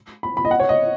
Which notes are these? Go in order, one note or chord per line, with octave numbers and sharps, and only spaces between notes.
B5
B5
D#5
F#5
C#5
D#5